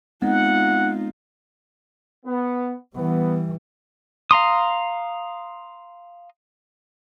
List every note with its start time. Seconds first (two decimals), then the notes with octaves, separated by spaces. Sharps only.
0.22 G#3 B3 C4 D#4 F4 F#5
2.26 B3
2.96 E3 G3 B3
4.31 F5 A#5 C6 D#6